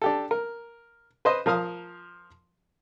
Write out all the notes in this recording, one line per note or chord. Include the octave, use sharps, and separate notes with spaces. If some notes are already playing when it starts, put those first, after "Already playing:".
D4 G4 A4
A#4
B4 C5 D#5
F3 A#4 F5 D#6 F6